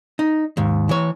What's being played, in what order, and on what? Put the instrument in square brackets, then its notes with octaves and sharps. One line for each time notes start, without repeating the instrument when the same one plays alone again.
[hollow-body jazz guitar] D#4
D#2 G#2
E3 C#5